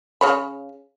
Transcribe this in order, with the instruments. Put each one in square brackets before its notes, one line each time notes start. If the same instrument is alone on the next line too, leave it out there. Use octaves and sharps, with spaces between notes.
[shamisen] C#3 C#5 B5